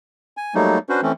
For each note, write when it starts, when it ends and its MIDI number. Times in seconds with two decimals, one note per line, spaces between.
0.37 0.54 80
0.55 0.78 54
0.55 0.78 55
0.55 0.78 57
0.55 0.78 58
0.55 0.78 63
0.89 1.01 61
0.89 1.01 62
0.89 1.01 66
0.89 1.01 71
0.89 1.01 72
1.02 1.12 52
1.02 1.12 57
1.02 1.12 60
1.02 1.12 61